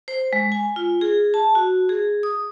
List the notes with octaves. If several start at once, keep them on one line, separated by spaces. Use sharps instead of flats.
C5
G#3
G#5
F4
G#4
A5
F#4
G#4
D#6